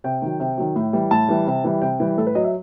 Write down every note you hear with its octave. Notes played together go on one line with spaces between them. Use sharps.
C3 G5
D#3 F#3
C3
D#3 F#3
A2
E3 G3
A2 A5
E3 G3
C3
E3 G3
C3 G5
E3 G3
A2 A4
B4
F#3 D#5
E5